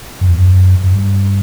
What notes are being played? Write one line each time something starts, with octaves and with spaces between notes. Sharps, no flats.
F#2
E2
F#2
F#2
G2